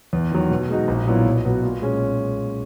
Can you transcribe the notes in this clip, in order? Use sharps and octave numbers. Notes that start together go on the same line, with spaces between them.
E2
D#3 F#3
B2
G#3 D#4 F#4
A#1
A#2 F#3 B3 E4
B1
B2 F#3 B3 F#4
A#2
G#3 C#4